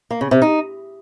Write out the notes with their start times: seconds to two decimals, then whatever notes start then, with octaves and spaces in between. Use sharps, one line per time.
0.11 A#3
0.21 C#3
0.31 C3
0.42 D#4